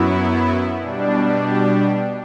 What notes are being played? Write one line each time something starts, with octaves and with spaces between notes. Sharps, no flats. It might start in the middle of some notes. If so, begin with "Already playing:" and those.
Already playing: F#2 F#3 B3 E4
B2 G3 D4
G4